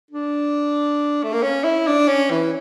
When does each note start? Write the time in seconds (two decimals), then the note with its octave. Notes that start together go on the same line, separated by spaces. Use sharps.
0.11 D4
1.24 A3
1.33 A#3
1.43 C#4
1.64 E4
1.87 D4
2.08 C#4
2.30 E3